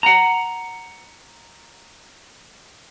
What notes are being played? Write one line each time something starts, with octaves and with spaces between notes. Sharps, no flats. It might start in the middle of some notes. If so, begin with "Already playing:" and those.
F#5 A#5